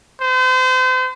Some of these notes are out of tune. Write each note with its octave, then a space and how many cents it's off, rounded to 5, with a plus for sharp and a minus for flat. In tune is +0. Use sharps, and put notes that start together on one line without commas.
C5 -40